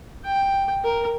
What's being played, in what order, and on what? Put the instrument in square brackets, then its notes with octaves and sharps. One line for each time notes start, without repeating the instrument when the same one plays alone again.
[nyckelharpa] G5
A#4